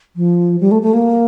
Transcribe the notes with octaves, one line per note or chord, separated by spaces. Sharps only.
F3
G3
A3
A3
A#3